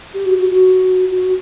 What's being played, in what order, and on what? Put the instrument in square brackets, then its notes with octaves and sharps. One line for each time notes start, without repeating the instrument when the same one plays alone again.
[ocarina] G4
F#4
F#4
F#4
F#4